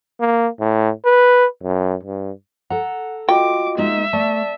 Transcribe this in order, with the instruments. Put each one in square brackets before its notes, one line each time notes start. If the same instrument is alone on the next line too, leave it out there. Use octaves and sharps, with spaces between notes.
[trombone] A#3
A2
B4
F#2
G2
[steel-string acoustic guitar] A4 A#5 [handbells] F#5
[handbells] F4 F#4 D#5 [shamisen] G5 [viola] D6
[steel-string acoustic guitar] G#3 A#3 D#4 [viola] E5
[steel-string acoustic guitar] A3 [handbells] D5 A5